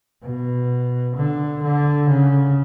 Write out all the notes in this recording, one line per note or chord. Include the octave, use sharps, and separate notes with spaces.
B2
D3
D3
C#3